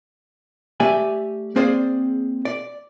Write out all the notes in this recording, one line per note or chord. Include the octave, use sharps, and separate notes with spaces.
A3 G4 D5 E5 G#5
A#3 C4 G#4 C5 D5
D5